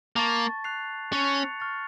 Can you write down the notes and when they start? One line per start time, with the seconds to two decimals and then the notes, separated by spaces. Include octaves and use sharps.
0.16 A#3 A5 C#6 A6
0.64 F#6 C7 F7
1.12 C#4 C#6 F#6 A6 C#7 F7
1.60 C#6 F6 A6